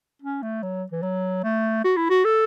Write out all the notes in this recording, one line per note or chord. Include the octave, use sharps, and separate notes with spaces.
C#4
A3
F#3
E3
F#3
A3
F#4
E4
F#4
A4